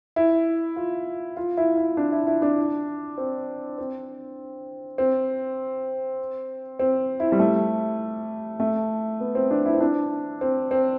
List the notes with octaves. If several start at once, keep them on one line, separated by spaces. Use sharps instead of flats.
E4
F4
F4
E4
E4
D4
E4
E4
D4
C4
C4
C4
C4
E4
G3
A3
A3
B3
C4
D4
E4
C4
D4
C4
C4